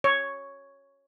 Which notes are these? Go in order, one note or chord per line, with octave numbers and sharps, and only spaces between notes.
C#5